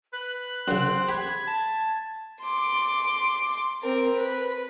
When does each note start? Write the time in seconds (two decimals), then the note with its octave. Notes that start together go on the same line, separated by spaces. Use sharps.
0.13 B4 F#6
0.68 F#2 C#3 C4
1.09 G4 B5 G#6
1.47 A5
2.42 C6 D6
3.83 C4 A#4
4.17 B4